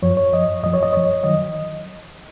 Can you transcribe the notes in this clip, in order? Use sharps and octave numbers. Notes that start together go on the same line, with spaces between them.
F#2 F3 C#5
C#5
F#2 F3 D#5
F#2 F3 D#5
C#5
D#5
F#2 F3 C#5
D#3 F#3 D#5